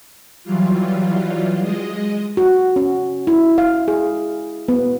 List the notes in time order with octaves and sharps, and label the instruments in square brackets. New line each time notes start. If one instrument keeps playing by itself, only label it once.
[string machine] E3 F#3 G3 F4
G#3 D#5
[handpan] F#4
C#4
E4
F5
G#4
B3